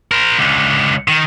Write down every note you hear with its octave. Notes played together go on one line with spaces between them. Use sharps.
A#4 C5
C#2 D3
D#3